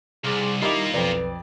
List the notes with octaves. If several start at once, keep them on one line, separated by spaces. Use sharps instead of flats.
C2 G#4 C6 D6 F6 A6
D#3 G3 A#3 E4 F4 A#4 D#5 D6
B1 F2 F3 B4 D5